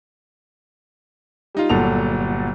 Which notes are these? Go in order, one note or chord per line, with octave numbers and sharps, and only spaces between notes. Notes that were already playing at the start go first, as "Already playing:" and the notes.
G3 D#4 F4
G1 A#2 F#3 A4 F7